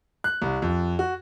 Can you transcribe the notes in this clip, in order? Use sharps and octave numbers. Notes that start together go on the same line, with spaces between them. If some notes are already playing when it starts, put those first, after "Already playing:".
F#6
C2
F2
F#4